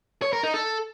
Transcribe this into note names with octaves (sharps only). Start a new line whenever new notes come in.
C#5
A#4
D#4
A4